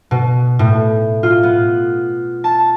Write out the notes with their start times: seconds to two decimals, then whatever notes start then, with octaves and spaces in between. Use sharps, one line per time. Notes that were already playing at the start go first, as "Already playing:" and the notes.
0.11 B2
0.59 A2
1.23 F4
1.43 B3
2.44 A5